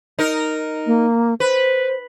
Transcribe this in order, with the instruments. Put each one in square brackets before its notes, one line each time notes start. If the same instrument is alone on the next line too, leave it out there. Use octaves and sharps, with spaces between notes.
[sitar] D#4 A#4
[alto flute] A#3
[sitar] B4 [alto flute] C5